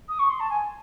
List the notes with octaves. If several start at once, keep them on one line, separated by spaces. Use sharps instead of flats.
D#6
C#6
C6
A5
G#5